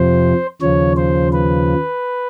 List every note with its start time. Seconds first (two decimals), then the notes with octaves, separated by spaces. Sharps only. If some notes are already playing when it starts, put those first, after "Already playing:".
Already playing: F2 C3 F3 C5
0.61 D#2 C#3 F3 C#5
0.97 C5
1.33 B4